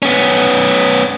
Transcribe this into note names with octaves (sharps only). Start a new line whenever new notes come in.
B3 C#4